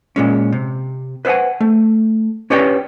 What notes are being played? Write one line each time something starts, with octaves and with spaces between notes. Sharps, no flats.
A#2 G#3 C#4
C3
B4 C5 E5 F#5 G#5
A3
C#4 G4 B4 C#5 D5 G5